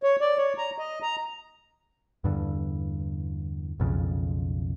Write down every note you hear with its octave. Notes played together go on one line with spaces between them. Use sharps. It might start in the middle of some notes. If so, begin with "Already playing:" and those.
C#5
D5
C#5
A#5
D#5
A#5
E2 G2 D3
B1 F2 C#3